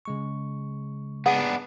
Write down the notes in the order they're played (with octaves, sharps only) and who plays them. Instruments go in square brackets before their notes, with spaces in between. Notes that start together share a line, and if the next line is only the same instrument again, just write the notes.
[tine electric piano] C#3 G#3 C#6
[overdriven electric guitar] B3 D4 [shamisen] G#4 F#5